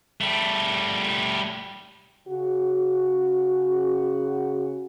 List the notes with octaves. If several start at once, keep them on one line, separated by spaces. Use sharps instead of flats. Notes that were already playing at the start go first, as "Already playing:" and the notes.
G3 A3
C#3 F#4